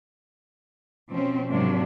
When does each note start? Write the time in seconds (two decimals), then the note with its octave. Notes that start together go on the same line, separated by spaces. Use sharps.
1.11 B2 F3 C4 C#4
1.51 G#2 C3 F#3 A#3 D4